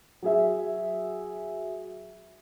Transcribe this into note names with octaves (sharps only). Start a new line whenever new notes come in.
F#3 G#4 E5